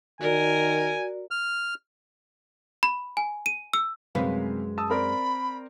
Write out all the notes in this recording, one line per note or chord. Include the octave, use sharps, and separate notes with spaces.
D#3 F#4 A#4 D5 G#5
F6
B5
G#5
D#7
E6
F#2 C3 G#3 B4 F5
A5 D#6 E6
C4 A#4 D5 B5